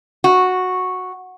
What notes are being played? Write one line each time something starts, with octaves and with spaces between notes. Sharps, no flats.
F#4